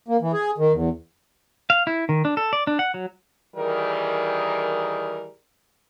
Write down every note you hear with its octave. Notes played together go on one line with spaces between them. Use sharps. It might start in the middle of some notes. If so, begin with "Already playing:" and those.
A#3
E3
G#4
D#3
E2
F5
E4
D#3
D4
A4
D5
D4
F#5
F#3
D#3 E3 G3 G#4 A#4